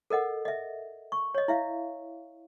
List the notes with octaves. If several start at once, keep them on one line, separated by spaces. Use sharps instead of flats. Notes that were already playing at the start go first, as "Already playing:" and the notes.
A4 A#4 D#5 F#5
D#5 E5
C#6
C#5 D#5
E4 E5 F5